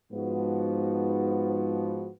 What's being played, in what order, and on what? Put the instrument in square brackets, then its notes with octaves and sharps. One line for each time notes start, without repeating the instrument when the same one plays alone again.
[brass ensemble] G#2 F3 B3 F#4